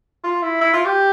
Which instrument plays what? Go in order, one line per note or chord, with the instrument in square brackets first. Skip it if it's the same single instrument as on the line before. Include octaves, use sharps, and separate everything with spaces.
[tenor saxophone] F4
E4
E4
F4
G4